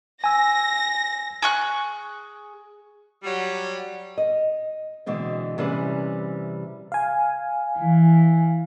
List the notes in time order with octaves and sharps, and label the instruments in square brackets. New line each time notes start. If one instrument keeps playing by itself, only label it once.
[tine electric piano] G#5 E6 [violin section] A#6
[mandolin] G#4 C#6 F#6
[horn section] F#3 G3
[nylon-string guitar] D#5
B2 D3 E3 G#3 C4
C3 E3 G3 C#4 G#4 B4
[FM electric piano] F5 G#5
[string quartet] E3